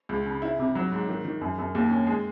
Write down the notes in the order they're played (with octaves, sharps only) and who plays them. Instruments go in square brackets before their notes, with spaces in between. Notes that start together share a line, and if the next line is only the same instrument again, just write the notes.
[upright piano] C#2
C#3
E4
C3
F#3
G#2
D#3
D#3
F#2
F#2
D#2
C#4
G#3